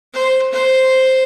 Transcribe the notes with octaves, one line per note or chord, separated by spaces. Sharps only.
C5
C5